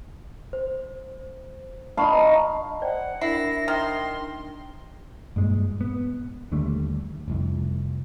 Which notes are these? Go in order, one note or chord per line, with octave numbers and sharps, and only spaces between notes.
C5
D#4 F5 A5 B5 C#6
C5 D5 F#5 G5
D4 E4 A#4 A#6 C7
D#3 G5 C6
G2 A#2 G#3
B3
D#2 D3 G3 A3
F1 C2 F2